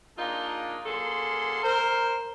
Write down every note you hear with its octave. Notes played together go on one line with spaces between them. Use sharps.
A#3 D4 D#4 F4 G#4 A#4
F#2 A#3 G#4 A4 C6
A#4 C5